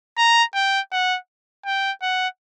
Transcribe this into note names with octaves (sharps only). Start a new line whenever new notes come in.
A#5
G5
F#5
G5
F#5